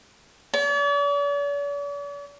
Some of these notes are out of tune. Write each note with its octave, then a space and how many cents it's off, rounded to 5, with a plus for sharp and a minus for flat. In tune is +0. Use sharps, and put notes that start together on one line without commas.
D5 -45